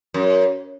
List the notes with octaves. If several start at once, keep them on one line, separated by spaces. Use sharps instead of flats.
F#2